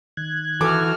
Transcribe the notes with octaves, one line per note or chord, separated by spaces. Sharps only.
D#3 F#6 G#6
E3 F#4 A4 D6 F6